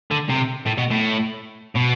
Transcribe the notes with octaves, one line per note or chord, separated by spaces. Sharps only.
D3
C3
A2
B2
A2
B2